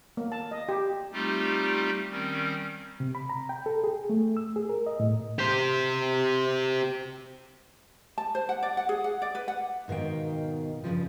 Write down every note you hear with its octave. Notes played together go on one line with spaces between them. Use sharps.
A#3
A5
D#5
G4
G3 A3 C4 D#4 F4 G4
D#3 G3 C4 C#4
C3
B5
A#5
G5
A4
G#4
A3
E6
G#4
A#4
D#5
A2
G4 C5
A5
C5
F#5
D5
F#5
G#4
F#5
D5
B4
F#5
G#2 B2 D#3 F5 G5
G2 A#2 C#3 F3